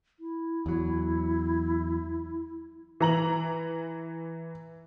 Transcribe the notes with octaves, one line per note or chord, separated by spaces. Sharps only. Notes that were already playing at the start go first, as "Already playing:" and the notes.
E4
E2 F#3
E3 A#5 F#7